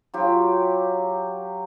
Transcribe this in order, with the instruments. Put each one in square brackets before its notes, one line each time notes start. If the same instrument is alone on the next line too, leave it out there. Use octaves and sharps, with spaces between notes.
[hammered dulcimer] F#3 F4 G4